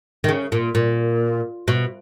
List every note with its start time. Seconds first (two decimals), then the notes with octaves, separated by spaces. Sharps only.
0.24 D#3
0.29 C#3
0.52 A#2
0.75 A#2
1.68 B2